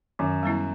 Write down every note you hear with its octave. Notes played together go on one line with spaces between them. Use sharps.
F#2 D#3
G3 B3 E4